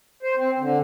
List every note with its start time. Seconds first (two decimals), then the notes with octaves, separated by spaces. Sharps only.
0.23 C5
0.37 C4
0.60 D3